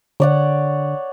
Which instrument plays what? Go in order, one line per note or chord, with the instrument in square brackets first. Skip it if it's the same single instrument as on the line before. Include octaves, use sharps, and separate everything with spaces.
[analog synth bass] D3 [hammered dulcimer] C#5 D5 F#5